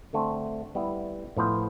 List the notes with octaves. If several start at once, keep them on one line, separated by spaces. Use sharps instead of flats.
D3 A3 C4
G3 B3 E4
A2 F3 B3 F4 C5